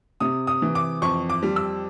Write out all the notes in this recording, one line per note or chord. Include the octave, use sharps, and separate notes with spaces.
C3 D#6
D#6
E3
D6
F2 C#6
D6
G3
E6